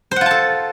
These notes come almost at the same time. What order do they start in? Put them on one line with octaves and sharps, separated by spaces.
C5 F#5 F4 A5 A4